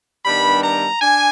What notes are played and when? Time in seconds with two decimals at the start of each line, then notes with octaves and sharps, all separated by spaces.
0.24 G2 D#3 G3 B3 D4 B5
0.63 A#5
1.02 D4 G#5